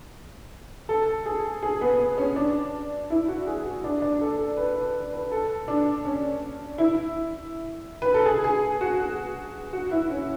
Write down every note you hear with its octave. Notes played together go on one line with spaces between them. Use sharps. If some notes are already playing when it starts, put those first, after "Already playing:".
A4
G#4
G#4
B3
B3
C#4
D4
E4
F#4
G#4
F#4
D4
D4
A4
A4
B4
B4
B4
A4
D4
C#4
E4
B4
A4
G#4
G#4
F#4
G#4
F#4
E4
C#4